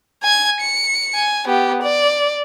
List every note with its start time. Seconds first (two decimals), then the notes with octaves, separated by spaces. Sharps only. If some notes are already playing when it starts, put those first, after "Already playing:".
0.23 G#5 G#6
0.60 C#7
1.15 G#5
1.47 B3 G4
1.83 D5